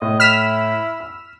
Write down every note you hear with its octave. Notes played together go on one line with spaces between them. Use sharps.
A2 D#5
E4 F6 B6 E7
E6